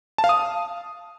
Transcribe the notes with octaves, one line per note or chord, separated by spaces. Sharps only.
A5
F5
D#6